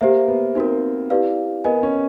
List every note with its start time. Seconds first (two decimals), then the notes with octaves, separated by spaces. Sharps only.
0.01 A#3 G4 C5 E5
0.28 B3
0.55 C4 D#4 F#4 A#4
1.10 E4 G4 B4 D5 F5
1.64 B3 A#4 D#5 G#5
1.83 C#4